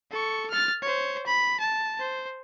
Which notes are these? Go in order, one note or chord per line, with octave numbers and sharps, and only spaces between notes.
A4 C#6
F6 A6
C5 C#5
B5
A5
C5